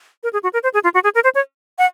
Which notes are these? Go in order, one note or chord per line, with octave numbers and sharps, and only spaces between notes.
A#4
G#4
F#4
A#4
C5
G#4
F4
F#4
G#4
A#4
C5
C#5
F#5